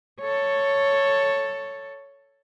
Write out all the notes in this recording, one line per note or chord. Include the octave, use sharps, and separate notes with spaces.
A4 C#5